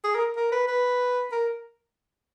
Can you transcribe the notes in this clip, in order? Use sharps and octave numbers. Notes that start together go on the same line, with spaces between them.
G#4
A#4
A#4
B4
B4
A#4